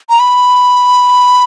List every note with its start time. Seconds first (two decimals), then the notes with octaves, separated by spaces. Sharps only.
0.09 A#5
0.20 B5